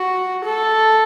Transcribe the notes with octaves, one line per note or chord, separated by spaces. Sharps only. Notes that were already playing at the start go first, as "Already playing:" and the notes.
Already playing: F#4
A4